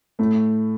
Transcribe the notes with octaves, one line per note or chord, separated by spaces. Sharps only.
A2 A3